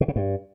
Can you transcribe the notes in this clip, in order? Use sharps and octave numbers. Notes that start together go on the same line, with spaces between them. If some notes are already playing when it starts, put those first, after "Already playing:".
B2
C#3
G2